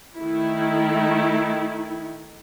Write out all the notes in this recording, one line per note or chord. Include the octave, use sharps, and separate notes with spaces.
D#3 A3 E4